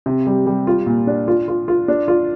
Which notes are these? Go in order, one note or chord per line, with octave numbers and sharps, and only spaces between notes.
C3
G3
G3
F4
A#2
D4
F4
F4
F4
D4
F4